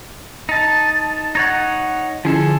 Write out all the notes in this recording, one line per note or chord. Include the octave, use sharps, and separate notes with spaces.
D#4 A5
D#4 C#5 F#5 G#6 A6
D3 F3 C#4 E4 G#4 A4